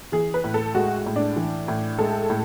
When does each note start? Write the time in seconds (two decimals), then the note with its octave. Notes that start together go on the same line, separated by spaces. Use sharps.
0.12 E3 G#4
0.34 B4
0.44 A2
0.54 A4
0.75 G#3 F#4
1.06 A2
1.16 D4
1.36 E3
1.68 A2
1.99 G#3 A4
2.30 A2